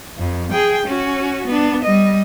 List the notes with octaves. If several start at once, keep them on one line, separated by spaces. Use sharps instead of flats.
F2
G#4 G5
C#4 F#4
B3 D4
G3 D#5